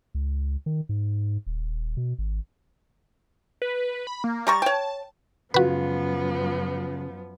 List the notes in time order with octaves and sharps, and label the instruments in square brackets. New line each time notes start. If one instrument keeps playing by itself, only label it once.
[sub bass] C#2
D#3
G#2
D#1
B2
G#1
[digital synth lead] B4
B5
A#3
[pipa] G3 A#5 C#6 [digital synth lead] A6
[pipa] C#5 G5 [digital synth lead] A5
[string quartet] F#2 F3 B3 [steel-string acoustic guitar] C#3 G#3 F4 [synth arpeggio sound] F#4 B4